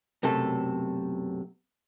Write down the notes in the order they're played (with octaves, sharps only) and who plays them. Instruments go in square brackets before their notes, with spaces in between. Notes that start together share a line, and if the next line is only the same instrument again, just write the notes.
[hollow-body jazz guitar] B1 F#2 C3 A3 A4